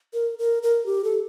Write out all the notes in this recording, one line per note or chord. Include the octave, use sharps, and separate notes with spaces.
A#4
A#4
A#4
G4
A4